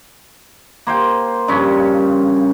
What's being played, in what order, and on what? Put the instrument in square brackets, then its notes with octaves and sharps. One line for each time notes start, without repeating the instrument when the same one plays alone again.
[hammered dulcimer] A#3 C5 G5
G2 C#3 F3 C#4